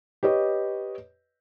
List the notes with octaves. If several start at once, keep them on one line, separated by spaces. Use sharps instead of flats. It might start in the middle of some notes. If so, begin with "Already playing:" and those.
G4 B4 C#5 D#5